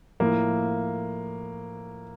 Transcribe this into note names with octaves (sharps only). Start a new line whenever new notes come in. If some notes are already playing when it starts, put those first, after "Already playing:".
A2 F3 A#3